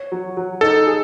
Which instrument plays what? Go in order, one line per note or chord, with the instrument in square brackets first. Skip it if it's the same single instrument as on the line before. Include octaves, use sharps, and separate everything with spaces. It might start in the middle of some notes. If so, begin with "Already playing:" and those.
Already playing: [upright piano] C#5
F#3
F#3
[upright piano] D#4 [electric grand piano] A4
[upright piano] G#4